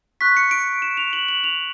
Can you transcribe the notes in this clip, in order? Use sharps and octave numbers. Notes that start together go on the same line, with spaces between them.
C#6 F#6 B6
C#7
D7
E7
F7
F#7
F#7
F7